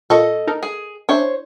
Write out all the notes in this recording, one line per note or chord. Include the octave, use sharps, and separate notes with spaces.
A#2 A4 D#5 C#6
D#4 A4 A#4
G#4
C#4 D4 E4 C5 C#5